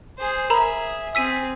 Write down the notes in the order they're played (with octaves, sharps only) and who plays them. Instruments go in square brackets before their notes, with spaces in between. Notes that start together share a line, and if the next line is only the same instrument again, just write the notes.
[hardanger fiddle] G#4 C5
[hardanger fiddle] G#4 E5 [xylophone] A#4 A#5 B5
[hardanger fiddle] C4 G#4 [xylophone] E6 B6 D#7